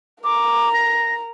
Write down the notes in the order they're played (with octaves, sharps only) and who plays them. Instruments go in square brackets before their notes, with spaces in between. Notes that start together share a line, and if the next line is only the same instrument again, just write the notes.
[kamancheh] A#4 A#5 [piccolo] D6
[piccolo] A#6